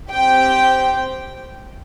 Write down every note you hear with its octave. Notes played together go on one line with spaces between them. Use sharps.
C4 G4 G5